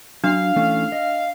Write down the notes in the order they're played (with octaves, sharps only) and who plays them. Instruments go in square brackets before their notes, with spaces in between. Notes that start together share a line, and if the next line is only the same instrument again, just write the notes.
[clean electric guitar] F#3 [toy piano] D4 [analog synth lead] F5
[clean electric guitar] E3 A3 C#4
D#5